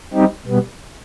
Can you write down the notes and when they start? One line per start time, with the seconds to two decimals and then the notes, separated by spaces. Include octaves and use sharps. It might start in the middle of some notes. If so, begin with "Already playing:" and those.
0.13 G3 C4 D#4 G4
0.46 B2 G3 B3